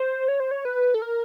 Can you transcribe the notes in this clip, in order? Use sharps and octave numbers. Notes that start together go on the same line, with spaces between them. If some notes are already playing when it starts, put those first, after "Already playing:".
Already playing: C5
C#5
C5
C#5
B4
A4
A#4